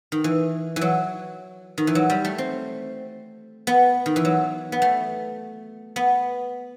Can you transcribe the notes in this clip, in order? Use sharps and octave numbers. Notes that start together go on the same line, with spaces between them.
D#3
E3
E3
F#3
D#3
E3
F#3
G3
A3
C4
B3
D#3
E3
F#3
B3
A3
B3